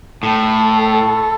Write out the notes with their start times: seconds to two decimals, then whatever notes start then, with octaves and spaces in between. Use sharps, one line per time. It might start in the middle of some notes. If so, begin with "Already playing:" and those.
0.23 A2 A4